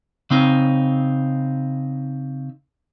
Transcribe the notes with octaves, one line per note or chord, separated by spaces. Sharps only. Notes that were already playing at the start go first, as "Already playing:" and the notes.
C#3 C4 D#4